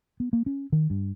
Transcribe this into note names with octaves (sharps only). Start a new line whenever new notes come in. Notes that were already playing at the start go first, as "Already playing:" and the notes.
B3
A#3
C#4
D#3
G2